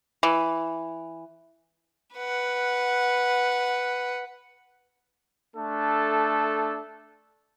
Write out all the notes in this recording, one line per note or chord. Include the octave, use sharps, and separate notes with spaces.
E3
B4 F#5
A3 D4 A4